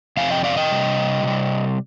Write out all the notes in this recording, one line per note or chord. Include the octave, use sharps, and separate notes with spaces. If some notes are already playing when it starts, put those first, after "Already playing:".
F2 C3 F3 F5 G#5
D#5 G5
D5 F5
D#5 G5
C3 G3
C3 G3